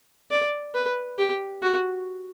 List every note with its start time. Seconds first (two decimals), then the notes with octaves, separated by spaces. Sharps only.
0.31 D5
0.75 B4
1.18 G4
1.62 F#4